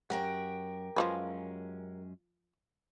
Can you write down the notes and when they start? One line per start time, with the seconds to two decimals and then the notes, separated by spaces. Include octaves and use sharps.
0.10 F#2 F#4 G4 A#4 F#5 G5
0.96 F#2 F3 G#3 C#4 F4 B4